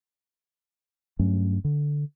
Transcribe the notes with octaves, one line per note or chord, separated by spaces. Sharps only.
G2 F#3 A3 C#4
D3